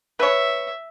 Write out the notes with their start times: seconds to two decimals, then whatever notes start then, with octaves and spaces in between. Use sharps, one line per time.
0.19 B4 C#5 E5